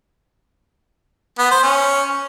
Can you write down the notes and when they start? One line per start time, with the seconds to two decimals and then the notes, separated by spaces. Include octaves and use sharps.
1.39 B3
1.51 C5
1.63 C#4